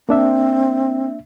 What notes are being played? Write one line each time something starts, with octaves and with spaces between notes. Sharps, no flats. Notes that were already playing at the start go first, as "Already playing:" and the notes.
A#3 C4 D4 E5